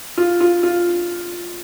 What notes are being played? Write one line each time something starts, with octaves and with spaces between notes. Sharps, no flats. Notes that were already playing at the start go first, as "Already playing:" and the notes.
F4
F4
F4